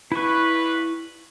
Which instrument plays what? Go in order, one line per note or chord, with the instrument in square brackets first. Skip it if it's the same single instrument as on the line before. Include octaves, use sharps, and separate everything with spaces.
[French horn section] G2 B4 [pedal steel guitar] E4 C#6